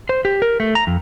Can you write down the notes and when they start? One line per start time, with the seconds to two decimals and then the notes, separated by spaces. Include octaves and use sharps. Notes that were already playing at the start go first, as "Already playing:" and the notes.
0.09 C5
0.25 G4
0.42 A#4
0.60 A3
0.75 A#5
0.87 F2